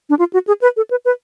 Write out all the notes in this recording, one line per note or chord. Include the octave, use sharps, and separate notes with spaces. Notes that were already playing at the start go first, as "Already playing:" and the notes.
D4
F4
F#4
G#4
B4
A4
B4
B4